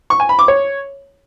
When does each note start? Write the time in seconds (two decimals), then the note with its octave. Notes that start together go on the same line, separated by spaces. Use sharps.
0.10 C#6
0.20 G#5
0.29 B5
0.39 D6
0.48 C#5